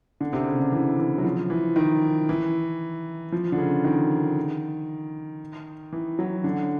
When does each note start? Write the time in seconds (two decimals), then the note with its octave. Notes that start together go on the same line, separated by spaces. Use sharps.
0.21 D3
0.33 C3
0.47 C#3
0.60 D3
0.72 E3
0.99 E3
1.18 F#3
1.24 F3
1.50 E3
1.76 D#3
2.29 E3
3.32 F3
3.52 D3
3.58 C#3
3.84 D#3
5.92 E3
6.19 F#3
6.44 D3